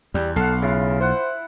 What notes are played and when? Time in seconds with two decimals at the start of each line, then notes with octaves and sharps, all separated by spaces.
0.14 E2 G3
0.36 B1 A4 F5 F#5
0.62 C#3 E4 F4
1.00 E4 C5 F#5